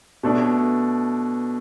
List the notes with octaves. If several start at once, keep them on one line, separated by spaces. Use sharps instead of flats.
B2 A3 D4